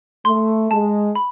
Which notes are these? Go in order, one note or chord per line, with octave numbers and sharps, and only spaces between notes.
A3 C6
G#3 A5
B5